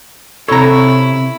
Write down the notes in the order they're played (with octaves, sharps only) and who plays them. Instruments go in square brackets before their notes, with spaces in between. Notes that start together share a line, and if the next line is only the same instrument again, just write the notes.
[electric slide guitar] C3 C#5 [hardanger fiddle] E4 [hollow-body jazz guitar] A4 A#5